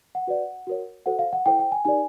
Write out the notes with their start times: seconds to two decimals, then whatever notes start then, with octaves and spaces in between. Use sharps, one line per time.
0.15 F#5
0.27 F#4 B4 D5
0.67 F#4 A#4 C#5
1.06 F#4 A4 C5 F#5
1.19 F5
1.33 F#5
1.46 E4 A4 C5 G5
1.59 G5
1.72 G#5
1.85 D#4 G4 A#4 D5 G#5